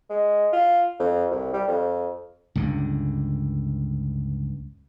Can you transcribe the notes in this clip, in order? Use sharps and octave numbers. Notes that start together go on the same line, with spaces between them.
G#3
F4
F2
C2
G3
F2
C#2 G2 D3